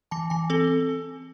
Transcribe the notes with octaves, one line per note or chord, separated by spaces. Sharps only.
E3 A5
E3 G#5
C4 A4